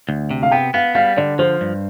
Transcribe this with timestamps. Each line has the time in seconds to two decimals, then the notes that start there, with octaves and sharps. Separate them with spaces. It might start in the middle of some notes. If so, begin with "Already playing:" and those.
0.09 D2
0.31 C3
0.43 F5
0.51 B3 G5
0.74 B3 F5
0.95 G3 F5
1.17 D3 D5
1.39 F3 C5
1.61 G2